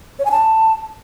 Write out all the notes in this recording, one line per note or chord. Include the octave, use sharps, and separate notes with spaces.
C#5
G#5
A5